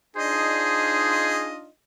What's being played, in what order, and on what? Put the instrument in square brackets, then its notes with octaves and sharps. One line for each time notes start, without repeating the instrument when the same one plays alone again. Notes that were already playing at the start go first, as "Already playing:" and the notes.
[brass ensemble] D4 D#4 F4 [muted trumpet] G#4 [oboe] C5 [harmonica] D#5